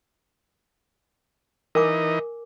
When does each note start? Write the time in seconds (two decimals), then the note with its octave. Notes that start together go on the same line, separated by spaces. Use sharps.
1.75 E3 D#4 A#4 D#5 G#5 D6